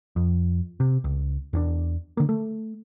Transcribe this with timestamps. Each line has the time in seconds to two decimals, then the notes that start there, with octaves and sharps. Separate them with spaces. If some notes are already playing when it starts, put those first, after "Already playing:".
0.16 F2
0.80 C3
1.04 C#2
1.53 E2 C#4 D4
2.17 D3 A#3
2.29 A3